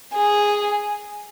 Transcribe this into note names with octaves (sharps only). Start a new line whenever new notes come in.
G#4